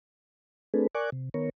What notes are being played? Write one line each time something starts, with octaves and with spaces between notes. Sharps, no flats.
A3 C4 D4 G#4 A4 B4
A#4 D5 G#5 C#6 D6 F#6
C3
D#3 B3 A#4 C#5